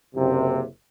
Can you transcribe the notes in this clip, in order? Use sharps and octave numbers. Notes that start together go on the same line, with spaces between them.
F#1 C3